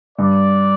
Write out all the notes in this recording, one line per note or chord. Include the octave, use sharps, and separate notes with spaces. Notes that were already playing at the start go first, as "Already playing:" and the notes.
G2 D5